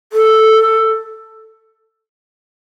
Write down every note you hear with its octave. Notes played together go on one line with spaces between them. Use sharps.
A4